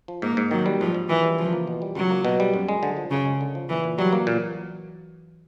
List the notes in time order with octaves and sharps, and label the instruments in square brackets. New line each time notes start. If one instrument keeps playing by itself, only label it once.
[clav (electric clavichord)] F3
[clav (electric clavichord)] G#2 [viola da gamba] A#3
[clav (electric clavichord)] G#2
[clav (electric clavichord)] D#3 [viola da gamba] F#3
[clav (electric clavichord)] G3
[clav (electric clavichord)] G#2 [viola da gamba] F3
[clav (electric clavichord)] G#2
[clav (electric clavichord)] D#3 [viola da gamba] E3
[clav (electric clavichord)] G3
[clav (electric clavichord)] C#2 [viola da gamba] F3
[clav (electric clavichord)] A#3
B2
G3
[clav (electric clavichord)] C#2 [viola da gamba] F#3
[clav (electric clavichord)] A#3
B2
G3
F#2
G#3
D3
F3
[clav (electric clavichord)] F#2 [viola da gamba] C#3
[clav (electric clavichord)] G#3
D3
F3
[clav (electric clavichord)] A#2 [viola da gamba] E3
[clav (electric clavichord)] A#2
[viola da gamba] F#3 [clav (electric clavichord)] G3
[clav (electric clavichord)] A#3
A#2